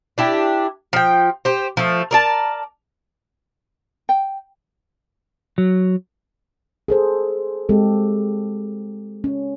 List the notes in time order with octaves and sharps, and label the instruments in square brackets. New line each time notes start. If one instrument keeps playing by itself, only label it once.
[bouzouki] D4 E4 G4
F3 G5
G4 C5
F3 A3
A#4 D5 A5
[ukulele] G5
[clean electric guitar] F#3
[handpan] G#4 A4 C5
G#3 C4 G4 A4
C#4